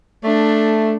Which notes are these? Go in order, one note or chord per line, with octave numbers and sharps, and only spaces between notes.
A3 D4